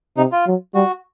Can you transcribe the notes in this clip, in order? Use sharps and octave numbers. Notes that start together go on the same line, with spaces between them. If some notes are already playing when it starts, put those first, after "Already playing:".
C3 D#4
F4
F#3
G3 F#4